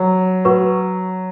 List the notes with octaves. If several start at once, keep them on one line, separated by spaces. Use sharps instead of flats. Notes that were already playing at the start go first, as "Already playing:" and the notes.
Already playing: F#3
F#4 B4 F#5 C#6